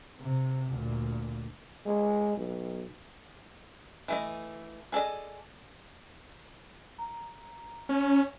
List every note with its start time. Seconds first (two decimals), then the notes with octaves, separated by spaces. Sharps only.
0.20 C3
0.70 D2 A#2
1.86 G#3
2.37 B1
4.08 E3 A3 D#5
4.92 G#4 A4 D5 D#5
6.99 A#5
7.89 C#4